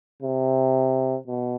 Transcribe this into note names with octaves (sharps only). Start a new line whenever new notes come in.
C3
B2